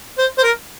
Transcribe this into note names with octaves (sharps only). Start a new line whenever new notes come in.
C5
C5
A#4